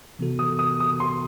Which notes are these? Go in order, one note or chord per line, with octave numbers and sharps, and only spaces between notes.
C3 E3 B3 F#4 A4
D#6
D#6
D#6
C6